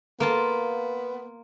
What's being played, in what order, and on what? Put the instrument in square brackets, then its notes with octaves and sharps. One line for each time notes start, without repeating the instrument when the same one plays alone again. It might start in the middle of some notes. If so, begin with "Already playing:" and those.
[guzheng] A#3 F4 A5 [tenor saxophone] B3